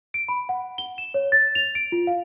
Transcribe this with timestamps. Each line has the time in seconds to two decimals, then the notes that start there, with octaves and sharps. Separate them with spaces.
0.14 D7
0.29 B5
0.49 F#5
0.78 G7
0.98 E7
1.14 C#5
1.32 A6
1.55 F7
1.75 D7
1.92 F4
2.07 F5